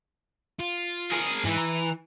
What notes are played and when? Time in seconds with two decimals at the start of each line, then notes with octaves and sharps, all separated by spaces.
0.60 F4
1.11 G#4 A#4
1.45 G#2 E3
1.57 A#5